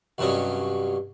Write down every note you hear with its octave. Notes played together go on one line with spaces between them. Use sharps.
C2 G2 F#3 C#4 D#5